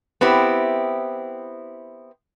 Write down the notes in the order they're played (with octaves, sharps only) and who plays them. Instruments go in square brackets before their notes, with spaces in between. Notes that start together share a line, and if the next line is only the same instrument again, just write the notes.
[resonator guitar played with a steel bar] B3 C4 E4 G4